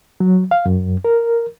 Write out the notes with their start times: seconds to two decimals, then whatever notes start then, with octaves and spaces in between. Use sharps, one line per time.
0.20 F#3
0.51 F5
0.66 F#2
1.05 A#4